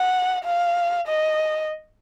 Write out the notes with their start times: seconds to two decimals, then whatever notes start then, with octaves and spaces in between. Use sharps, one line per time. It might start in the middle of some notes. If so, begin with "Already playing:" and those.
Already playing: F#5
0.44 F5
1.08 D#5